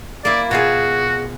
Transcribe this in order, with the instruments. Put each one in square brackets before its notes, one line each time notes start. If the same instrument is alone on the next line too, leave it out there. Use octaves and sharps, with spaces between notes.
[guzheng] A#3 E4 [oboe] D5
[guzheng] B2 F4 G#4 [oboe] F#4